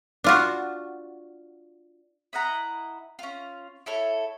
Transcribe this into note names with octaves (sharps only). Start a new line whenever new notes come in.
D4 F4 F#4
E4 D#5 F#5 A#5
C#4 F4
E4 A4 C#5